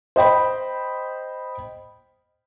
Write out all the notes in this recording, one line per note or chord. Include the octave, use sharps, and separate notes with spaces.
C5 D#5 G5 B5